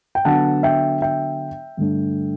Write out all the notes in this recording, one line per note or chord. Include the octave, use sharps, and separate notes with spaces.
G5
D3 F#3 B3 D4 F#5 A5
E5 G5
E5 G5
G2 D3 A3 D4